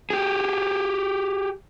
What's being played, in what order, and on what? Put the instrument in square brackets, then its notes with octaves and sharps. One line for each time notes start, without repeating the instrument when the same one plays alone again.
[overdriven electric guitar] G4 G#4